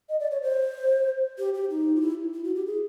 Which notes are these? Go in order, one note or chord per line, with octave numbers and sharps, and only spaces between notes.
D#5
D5
C#5
C5
G4
G4
D#4
F4
E4
E4
F#4
G4
G#4